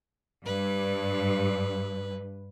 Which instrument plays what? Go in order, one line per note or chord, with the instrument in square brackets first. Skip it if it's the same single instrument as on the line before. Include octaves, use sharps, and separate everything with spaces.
[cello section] G2 [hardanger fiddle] B4